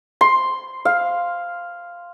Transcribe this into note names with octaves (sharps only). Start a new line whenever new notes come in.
C6
F5